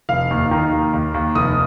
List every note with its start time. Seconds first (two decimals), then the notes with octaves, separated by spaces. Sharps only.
0.09 F1 F5
0.31 D#2
0.51 D#3
0.72 D#2
0.93 D#2
1.14 D#2
1.35 F1 D#6